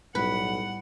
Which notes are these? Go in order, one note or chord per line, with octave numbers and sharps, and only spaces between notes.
B1 A2 G3 B4 F#5 F#7